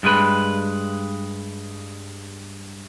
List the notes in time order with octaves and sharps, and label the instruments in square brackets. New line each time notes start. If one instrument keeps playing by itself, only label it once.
[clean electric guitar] G2 G#3 B4